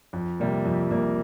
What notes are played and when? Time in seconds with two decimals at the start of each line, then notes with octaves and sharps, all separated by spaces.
0.13 F2
0.40 C3 G3 A#3
0.65 F2
0.91 C3 G3 A#3